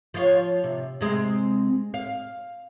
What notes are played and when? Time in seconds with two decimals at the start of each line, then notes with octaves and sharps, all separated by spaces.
0.14 F3 F4 C#5
0.64 C3
1.01 C3 G#3 C4
1.94 F5